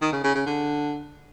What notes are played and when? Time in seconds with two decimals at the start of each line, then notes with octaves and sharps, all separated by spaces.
0.01 D#3
0.12 C#3
0.24 C#3
0.35 C#3
0.46 D3